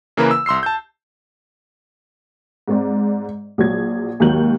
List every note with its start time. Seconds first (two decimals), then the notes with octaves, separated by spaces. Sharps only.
0.17 C#3 E3 A#3 A#4 B4
0.31 E6
0.46 C2 C6 E6 C7
0.63 A5 G6
2.68 G#2 C4 D5
3.58 A#1 F#3 G#6
4.20 D#2 G#2 D#3 F#3 G6 F#7